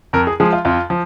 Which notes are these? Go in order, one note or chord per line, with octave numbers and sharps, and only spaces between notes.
F2 A#4
G#4
F3 G#3 G#4
F4
F2 F4
F3